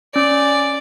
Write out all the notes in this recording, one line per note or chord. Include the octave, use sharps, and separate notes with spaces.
C#4 D5